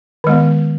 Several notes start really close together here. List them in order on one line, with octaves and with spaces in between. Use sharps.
D#3 G#3 B3